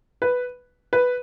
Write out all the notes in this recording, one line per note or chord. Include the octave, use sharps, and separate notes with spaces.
B4
B4